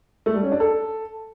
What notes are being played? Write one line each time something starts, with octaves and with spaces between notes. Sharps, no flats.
A3
G3
C#4
D4
A4